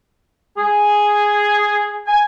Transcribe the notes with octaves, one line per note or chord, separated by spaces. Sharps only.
G#4
G#5